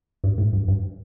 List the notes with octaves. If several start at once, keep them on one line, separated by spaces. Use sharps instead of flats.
G2
A2
G2
G2